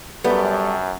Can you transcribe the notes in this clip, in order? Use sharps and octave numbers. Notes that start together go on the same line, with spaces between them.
F#2 G3 A3 B3 G4